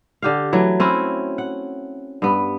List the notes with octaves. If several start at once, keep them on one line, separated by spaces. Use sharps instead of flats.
D3 G4 F5
E3 F#3 A3
C4 C#4 E4 F#4
F#5
G2 B3